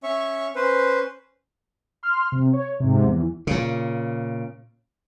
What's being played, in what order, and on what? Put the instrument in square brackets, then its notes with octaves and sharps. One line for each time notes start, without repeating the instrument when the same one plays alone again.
[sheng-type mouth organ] C#4 C#5 E5 C#6
C#4 B4 C5
[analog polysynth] C6 F6
C3
C#5
G#2 C3
E2 E3
[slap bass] A#2 C#3